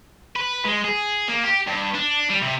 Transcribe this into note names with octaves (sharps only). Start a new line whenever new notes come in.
B4
G#3
G#4
A#3
G4
G2
D4
G3
C3